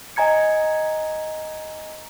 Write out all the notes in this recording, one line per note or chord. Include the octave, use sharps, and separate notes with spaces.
D#5 G#5 A#5 G#6 C#7